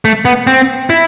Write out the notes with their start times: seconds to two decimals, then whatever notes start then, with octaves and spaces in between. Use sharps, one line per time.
0.05 A3
0.25 B3
0.47 C4
0.90 E4